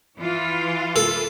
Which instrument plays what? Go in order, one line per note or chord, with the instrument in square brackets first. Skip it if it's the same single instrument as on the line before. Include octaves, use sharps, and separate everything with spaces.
[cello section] E3 F4
[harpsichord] A4